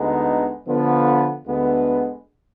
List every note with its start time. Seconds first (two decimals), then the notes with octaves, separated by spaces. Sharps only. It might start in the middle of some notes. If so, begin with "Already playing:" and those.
Already playing: D2 D3 G#3 B3 D#4
0.66 D3 F3 B3 F4
1.45 D2 D3 G#3 B3